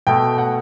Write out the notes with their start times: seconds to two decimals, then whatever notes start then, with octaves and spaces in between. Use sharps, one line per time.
0.07 B2 A3 G5
0.38 F#5